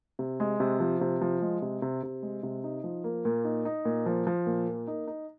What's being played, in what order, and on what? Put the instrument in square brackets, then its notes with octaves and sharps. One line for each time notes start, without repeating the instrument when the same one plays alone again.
[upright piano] C3
G#3
C3
F3
C3
F3
G#3
C3
C3
C3
G#3
C3
D#4
F3
A#3
A#2
D#4
D#4
A#2
F3
F3
A#2
A#3
D#4
D#4